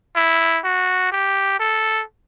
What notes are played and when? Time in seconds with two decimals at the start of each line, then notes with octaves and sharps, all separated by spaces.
0.16 E4
0.64 F#4
1.12 G4
1.60 A4